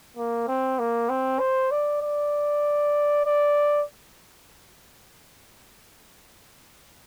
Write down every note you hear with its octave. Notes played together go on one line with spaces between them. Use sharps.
A#3
C4
A#3
C4
C5
D5
D5
D5